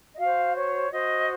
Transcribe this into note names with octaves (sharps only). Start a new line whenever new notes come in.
D#5
F#4 C5 F5
C#5
F#4 C5 D#5